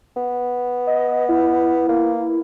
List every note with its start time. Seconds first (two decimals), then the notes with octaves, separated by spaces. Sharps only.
0.16 B3
0.87 D#5
1.29 E4
1.88 A#3